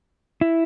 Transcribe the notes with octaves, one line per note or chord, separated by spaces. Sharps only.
E4